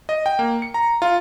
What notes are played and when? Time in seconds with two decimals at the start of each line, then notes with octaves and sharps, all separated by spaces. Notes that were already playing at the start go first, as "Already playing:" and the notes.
0.09 D#5
0.26 G5
0.39 A#3
0.62 C#7
0.74 A#5
1.02 F4